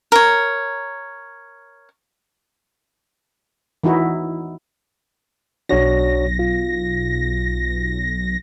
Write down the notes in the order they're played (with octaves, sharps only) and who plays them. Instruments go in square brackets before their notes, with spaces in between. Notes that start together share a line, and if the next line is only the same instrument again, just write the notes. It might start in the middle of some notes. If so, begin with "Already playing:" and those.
[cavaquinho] A#4 C#5
[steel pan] E3 D#4 E4 F#4
[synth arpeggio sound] B1 A#6 [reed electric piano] D4 F#4 C#5
[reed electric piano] F4